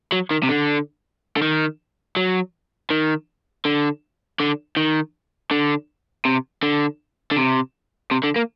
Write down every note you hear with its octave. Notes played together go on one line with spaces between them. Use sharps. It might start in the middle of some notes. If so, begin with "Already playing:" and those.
F#3
D#3
C3
D3
D3
D#3
F#3
D#3
D3
D3
D#3
D3
C3
D3
D3
C3
C3
D3
A#3